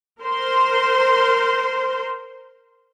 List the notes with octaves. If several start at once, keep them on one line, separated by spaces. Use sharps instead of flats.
A#4 C5 C6